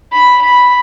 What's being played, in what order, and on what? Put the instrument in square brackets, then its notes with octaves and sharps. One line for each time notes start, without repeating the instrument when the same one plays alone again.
[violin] B5
B5